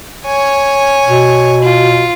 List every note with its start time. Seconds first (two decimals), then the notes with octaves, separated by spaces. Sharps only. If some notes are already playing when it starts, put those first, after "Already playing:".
0.25 C#5 G#5
1.07 B2
1.62 F4